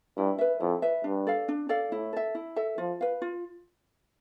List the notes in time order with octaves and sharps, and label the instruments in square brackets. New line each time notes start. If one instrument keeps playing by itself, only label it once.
[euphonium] G2 [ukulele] E4
[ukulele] B4 E5
[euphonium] F2 [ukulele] E4
[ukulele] B4 E5
[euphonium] G2 [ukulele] D4
[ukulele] A4 D5 F5
D4
A4 D5 F5
[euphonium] A2 [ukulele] E4
[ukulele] A4 E5
E4
A4 E5
[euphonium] F3 [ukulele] F4
[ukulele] B4 F5
F4